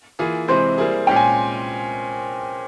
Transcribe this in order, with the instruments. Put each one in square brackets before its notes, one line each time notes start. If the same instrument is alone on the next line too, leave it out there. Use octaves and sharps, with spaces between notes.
[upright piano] E3 A#3 F4 G#4
[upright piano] C3 E3 G#3 C4 [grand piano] C5
[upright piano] G3 A#3 E4 G#4
[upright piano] A#2 G#3 C#4 [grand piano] G5
[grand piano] G#5